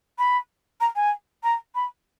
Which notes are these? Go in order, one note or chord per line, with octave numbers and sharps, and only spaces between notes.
B5
A#5
G#5
A#5
B5